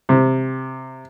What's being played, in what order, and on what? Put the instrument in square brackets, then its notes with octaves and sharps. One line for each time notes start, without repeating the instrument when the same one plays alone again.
[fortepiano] C3